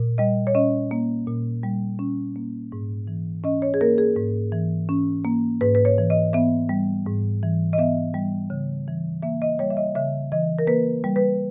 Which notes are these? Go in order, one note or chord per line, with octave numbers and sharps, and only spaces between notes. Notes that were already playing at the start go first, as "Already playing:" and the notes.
Already playing: A#2
G3 D#5
C#5
C#4 D#5
A#3
A#2
G3
C#4
A#3
G#2
E3
C#4 D#5
C#5
G#4
A#3 A#4
G#4
G#2
E3
C#4
A#3
G#2 B4
B4
C#5
E3
D#5
B3 E5
G3
G#2
E3
D#5
B3 E5
G3
C#3
E3
A#3 E5
D#5
G3 C#5
E5
D#5
C#3 E5
E3 D#5
A#4
A#3 B4
G3
B4